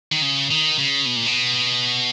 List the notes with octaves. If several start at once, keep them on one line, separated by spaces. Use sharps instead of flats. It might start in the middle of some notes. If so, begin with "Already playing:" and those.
D#3
C#3
D#3
C#3
B2
A#2
B2